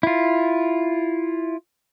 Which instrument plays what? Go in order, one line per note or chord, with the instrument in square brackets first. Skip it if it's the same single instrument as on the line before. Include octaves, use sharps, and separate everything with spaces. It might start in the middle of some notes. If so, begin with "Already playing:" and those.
[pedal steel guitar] E4 F4